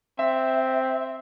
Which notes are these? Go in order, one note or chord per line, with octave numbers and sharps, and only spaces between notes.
C4 E5